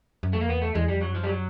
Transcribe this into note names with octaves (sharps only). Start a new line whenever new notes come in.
F#2
F2 A3
A#3
E2 B3
A3
E2 G#3
F2 G3
F#3
F#2
F3
G3
F#3